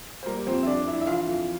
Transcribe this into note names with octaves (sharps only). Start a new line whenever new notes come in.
C5
G3 A#3 A#4
F2 C4 C5
E5
F2 D4 D5
D4 E4 E5
E5
E3 F4 F5
F2